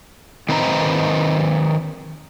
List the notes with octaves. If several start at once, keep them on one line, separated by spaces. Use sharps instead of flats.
D#3 C4 D#4 B4 C5 A#5